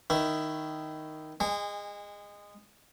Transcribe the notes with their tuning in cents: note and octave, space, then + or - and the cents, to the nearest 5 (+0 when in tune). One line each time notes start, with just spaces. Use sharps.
D#3 +0 E4 +10
G#3 -20 G#5 -35